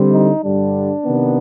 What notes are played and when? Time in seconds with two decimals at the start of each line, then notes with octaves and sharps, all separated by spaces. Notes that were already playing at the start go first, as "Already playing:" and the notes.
Already playing: D3 G3 C4
0.12 D#4
0.43 G2 D3 G3 D4
1.04 C3 D#3 B3